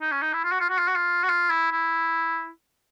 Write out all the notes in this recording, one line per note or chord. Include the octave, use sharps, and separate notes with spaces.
D#4
C#4
D#4
E4
F4
F#4
F4
F#4
F4
F#4
F4
F#4
F4
E4
E4